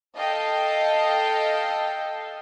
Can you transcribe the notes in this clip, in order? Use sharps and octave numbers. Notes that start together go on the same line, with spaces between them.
A4 D#5 F5 G5